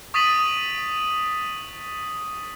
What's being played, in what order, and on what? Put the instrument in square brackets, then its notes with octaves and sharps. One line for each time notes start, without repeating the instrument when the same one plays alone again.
[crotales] C#6 D#6 A6 B6 D#7 F#7